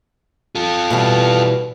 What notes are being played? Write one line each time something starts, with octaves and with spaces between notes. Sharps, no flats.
F4 A4
B2 E3 G3